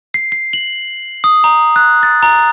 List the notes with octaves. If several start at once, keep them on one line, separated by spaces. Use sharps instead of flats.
C7
C7
F#7
D#6
A#5
F#6
A6
A#5